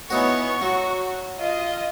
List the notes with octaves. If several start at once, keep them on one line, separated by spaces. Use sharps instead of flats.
E3 B3 D#4 F#4 C#5 C#6
F#3 F#4
F4 D#5